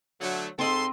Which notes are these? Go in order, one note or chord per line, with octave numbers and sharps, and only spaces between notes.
D3 F#3 A3
G#2 C4 A4 D#5 B5 C6